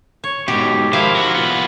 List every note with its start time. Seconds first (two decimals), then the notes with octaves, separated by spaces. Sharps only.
0.24 C#5
0.48 G#2 B2 G4
0.93 D#3 F3 E4 C5 F5
1.15 F#4 A#4
1.34 A#2 B3